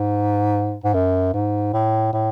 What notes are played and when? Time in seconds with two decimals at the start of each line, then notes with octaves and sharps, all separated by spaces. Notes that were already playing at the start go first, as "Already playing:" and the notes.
Already playing: G#2
0.84 G#2
0.94 F#2
1.34 G#2
1.74 A2
2.13 A2